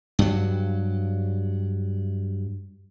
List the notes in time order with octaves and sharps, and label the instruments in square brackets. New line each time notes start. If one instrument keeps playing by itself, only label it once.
[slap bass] G2 F#3